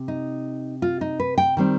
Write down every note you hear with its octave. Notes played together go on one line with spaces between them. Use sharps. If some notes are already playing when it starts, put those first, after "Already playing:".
Already playing: C3
D#4
F4
D#4
B4
G5
D#3 G3 C4